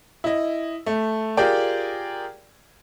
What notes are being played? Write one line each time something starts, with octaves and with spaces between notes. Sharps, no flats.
E4 D#5
A3
F4 G4 G#4 A#4 D5 G5